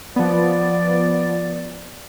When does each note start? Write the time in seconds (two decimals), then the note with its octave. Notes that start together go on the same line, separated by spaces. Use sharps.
0.16 F3 B3 D5